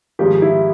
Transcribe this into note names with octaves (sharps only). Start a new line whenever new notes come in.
G#1 G#2 F3 G4
E4